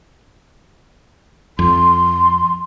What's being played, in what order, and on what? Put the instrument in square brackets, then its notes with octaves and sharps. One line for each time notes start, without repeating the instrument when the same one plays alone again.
[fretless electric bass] F2 [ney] C6